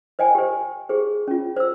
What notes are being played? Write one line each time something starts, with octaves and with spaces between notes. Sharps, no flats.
C5 D#5 G5 G#5
G4 C5
G4 G#4 C5
C#4 F4
C5 E6